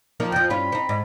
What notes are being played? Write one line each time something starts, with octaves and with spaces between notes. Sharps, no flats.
F3 A#3 D#4
F2 F3 G5
G2 C#4 F4 B5
C4 D#4
G#2